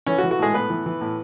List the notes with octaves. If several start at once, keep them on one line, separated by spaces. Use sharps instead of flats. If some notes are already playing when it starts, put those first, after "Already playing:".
E3 C#4 C#5
F#4
E3
F#4
A2 G#3 G#4
A2 B3 B4
E3
E3
A2